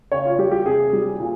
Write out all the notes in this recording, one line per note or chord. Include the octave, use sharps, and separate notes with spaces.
C#3 C#5
F4
G3 G4
G4
C3 G#4
G3
A#2